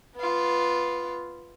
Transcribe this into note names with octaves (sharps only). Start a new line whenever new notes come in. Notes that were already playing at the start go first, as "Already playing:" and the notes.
B3 F4